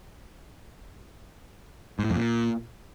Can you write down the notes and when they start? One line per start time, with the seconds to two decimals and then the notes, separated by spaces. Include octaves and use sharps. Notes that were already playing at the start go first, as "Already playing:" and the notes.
1.99 G#2
2.04 A2
2.10 F2
2.16 A#2